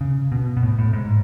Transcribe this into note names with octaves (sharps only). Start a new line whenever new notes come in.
C#3
B2
B2
A2
A2
G#2